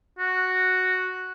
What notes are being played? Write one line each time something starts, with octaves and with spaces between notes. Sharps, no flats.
F#4